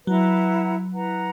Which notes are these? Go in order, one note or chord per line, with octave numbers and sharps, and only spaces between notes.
F#3 E4 B4 F#5 A#5
E4 B4 F#5 A#5